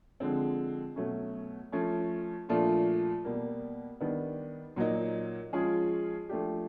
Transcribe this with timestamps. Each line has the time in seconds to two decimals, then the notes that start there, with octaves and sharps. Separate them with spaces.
0.20 D3 F3 G#3 C4
0.96 B2 F#3 A3 C#4
1.72 F3 A3 C#4
2.49 A#2 F3 A3 D4 F4
3.24 B2 G3 A#3
4.01 D#3 G3 B3 D4
4.76 A#2 F#3 A#3 D#4
5.53 F3 G#3 C#4 F4 G#4
6.29 F3 A3 D4 G4